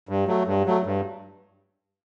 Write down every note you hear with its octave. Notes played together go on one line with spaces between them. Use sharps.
G2
F#3 A3
G2
F#3 A3
G2